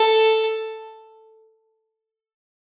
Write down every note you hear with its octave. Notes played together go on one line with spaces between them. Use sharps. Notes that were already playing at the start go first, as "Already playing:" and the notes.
Already playing: A4